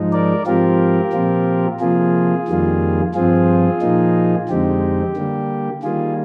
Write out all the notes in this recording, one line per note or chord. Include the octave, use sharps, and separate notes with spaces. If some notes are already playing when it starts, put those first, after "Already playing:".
Already playing: G#2 F3 G#3 D#4
A#4 D5
G#2 F3 C4 F4 G4 A#4
A#2 F3 C4 F4
C3 F3 A#3 F4 G#4
F2 D#3 G3 A#3 F4
G2 F3 C4 F4 G#4
A#2 F3 A#3 D#4
F2 D3 G#3 C4 D#4 G4
D3 G3 A#3
D#3 G3 A#3 F4 G#4